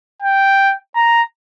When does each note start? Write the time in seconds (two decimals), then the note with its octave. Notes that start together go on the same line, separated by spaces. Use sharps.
0.22 G5
0.96 A#5